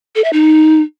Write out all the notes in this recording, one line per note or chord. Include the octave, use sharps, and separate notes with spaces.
A4
E5
D#4